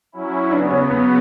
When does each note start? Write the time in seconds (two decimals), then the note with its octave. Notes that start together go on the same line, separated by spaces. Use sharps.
0.12 F#3 C#4 E4
0.51 C#3 F#3 B3 D4
0.71 C#4
0.91 B3